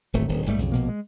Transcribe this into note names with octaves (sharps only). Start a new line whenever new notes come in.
D1 G#1 A#2 A3
D1 D#3
G#1 G#2 G3 A3
B1 F2 C#3
A#1 B2 A#3
G#3